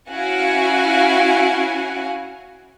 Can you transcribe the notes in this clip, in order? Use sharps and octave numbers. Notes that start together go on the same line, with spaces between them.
C#4 E4 F#4 F5 F#5 G#5